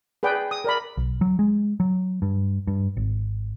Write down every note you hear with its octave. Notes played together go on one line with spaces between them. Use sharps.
G#4 B4 D5 G5
D#6
A#4 D5 B5
B1
F#3
G#3
F#3
G2
G2
G#1